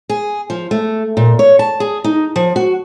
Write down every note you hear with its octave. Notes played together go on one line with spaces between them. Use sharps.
G#4
F3
A3
A#2
C#5
A5
G#4
D#4
F3
F#4